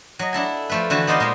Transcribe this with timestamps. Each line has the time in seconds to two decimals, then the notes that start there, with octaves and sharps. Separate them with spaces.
0.19 F#3 D#5
0.33 D4 E4 A4 G#5
0.69 F3 A3 B4
0.90 D3 E3 F#4 B4 G#5 A5
1.07 B3 D#4 C5 D5 D#5 F5
1.20 A#2 G#3 B3